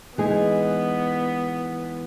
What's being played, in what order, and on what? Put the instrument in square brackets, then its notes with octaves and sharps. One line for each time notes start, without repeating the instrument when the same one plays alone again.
[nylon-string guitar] E3 G#3 D#4 G#4 [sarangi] B3